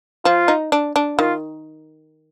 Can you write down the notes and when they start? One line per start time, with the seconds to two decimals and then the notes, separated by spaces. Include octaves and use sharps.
0.25 F3 F4
0.48 D#4
0.72 D4
0.96 D4
1.19 D#3 F4